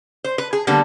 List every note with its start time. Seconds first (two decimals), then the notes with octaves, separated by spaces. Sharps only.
0.24 C5
0.38 B4
0.53 G#4
0.67 D3 G3 A#3 B3